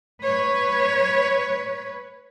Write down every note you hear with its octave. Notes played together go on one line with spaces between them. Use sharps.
B4 C#5